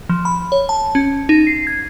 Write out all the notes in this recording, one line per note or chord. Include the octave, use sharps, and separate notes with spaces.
F3
B5
C#5
A5
C#4
D#4
C7
G#6